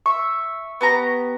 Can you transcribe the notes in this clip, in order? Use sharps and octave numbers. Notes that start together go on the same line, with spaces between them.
E5 C#6
B3 G4 A#5